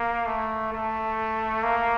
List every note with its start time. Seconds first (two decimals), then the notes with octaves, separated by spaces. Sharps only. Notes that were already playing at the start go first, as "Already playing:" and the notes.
Already playing: A#3
0.26 A3
0.72 A3
1.63 A#3